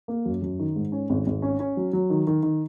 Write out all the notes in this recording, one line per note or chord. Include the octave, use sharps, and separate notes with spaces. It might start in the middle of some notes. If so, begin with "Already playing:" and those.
A#3
F#2
F#2
D#3
G#2
C#4
G#1
G#1
C#4
C#4
F#3
F#3
D#3
D#3
D#3